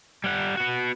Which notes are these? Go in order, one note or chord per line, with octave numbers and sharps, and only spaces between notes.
G3 F#5
B3 F#4